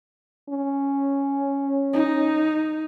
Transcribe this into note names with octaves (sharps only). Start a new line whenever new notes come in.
C#4
D#4